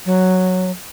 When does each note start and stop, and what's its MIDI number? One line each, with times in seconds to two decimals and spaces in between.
0.06 0.71 54